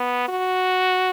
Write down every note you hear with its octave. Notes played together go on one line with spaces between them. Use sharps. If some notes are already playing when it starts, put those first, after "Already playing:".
Already playing: B3
F#4